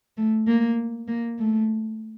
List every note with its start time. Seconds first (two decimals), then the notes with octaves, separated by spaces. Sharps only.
0.17 A3
0.47 A#3
1.08 A#3
1.39 A3